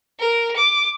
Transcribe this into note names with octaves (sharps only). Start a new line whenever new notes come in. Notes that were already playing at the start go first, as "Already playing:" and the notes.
A#4
D6